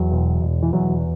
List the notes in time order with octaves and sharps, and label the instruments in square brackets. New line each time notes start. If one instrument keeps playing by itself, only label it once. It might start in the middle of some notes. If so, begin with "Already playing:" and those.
Already playing: [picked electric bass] E2 F#3
E1
E1
E3
E2 F#3